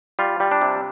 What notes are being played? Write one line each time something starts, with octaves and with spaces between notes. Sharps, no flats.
G3 F4
G3
D4
C3